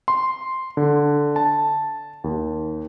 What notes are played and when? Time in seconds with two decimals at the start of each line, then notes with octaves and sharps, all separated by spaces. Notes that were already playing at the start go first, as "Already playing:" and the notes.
0.08 C6
0.77 D3
1.36 A5
2.24 D#2